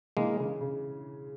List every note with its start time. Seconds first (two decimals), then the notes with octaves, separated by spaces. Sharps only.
0.17 E3 G#3 A#3
0.39 C#3
0.61 C#3